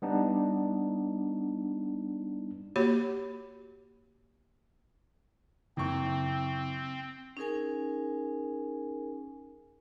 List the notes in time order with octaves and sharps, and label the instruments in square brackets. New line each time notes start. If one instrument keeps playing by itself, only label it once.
[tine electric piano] G3 B3 D4 D#4
[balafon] A#3 F#4 G4 C#5 B5
[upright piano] F#1 C#6 [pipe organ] C4
[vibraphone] C#4 D#4 G#4 A#4 G#5